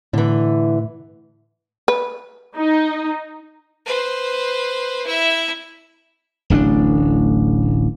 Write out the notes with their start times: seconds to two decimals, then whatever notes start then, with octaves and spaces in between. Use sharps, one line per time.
0.13 A2 D3 E3
1.88 B4
2.56 D#4
3.86 B4 C5
5.07 E4 E5
6.50 D1 A1 C#4 D4